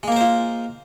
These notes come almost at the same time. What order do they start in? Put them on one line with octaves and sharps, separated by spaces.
G#3 A#3 A#4 C5 F4